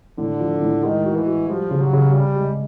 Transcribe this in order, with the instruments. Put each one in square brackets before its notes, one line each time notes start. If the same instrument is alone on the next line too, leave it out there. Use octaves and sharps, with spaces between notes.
[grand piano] A2 [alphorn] D3
[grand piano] F3
A2
[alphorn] D#3 [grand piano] G#3
[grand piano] F#4
[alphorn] E3
[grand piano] F#4
[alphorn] F3 [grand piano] G3
[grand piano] C#3
[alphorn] F#3
[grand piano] C#3
[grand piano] C3 [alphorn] G3
[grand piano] G#3